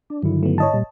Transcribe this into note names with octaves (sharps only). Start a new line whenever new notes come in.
D4
G2 D3 D#3 F#3 E4
A3 B3
C#5 D#5 A5
A#2 G3